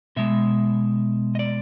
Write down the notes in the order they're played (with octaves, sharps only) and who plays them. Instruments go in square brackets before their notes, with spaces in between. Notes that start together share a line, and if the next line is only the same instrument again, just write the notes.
[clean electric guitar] B2 G#3 E5
D#5
D5